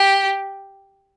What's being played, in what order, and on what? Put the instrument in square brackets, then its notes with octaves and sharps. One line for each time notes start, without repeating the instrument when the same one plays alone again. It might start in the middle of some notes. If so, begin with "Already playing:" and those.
Already playing: [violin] G4